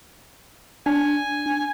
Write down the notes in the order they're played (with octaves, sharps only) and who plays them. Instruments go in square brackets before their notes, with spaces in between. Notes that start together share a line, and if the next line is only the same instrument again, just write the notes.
[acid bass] D4 [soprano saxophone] G#5